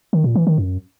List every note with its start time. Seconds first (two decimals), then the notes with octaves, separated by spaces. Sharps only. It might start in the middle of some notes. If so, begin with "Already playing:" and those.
0.13 D#3
0.24 A#2
0.35 E3
0.47 D#3
0.58 F#2